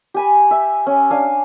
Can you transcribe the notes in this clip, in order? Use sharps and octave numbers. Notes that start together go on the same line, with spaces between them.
G4 G#5 B5
E5
C#4
D4 F5 G#5